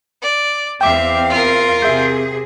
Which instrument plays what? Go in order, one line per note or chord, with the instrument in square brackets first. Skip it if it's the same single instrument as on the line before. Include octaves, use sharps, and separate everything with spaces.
[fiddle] D5
[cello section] E2 C4 F5 [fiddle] E5 [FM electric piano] G5 D6
[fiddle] F4 A#4
[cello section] C3 C4 G#4 [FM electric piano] E5 G6